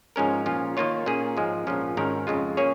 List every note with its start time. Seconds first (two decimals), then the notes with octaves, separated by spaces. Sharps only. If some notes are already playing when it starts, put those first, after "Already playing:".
0.16 G#2 F3 G#3 C#4 A#4
0.46 A#2 F3 C#4 F4
0.77 D#3 A#3 F4 C#5
1.06 A#2 A#3 C#4 G#4
1.37 G#2 F3 G#3
1.67 A#1 G#2 F3 C#4
1.97 G#1 G#2 D#3 C#4 A#4
2.27 F2 C#3 G#3 F4
2.57 A#3 C#4 G#4 C#5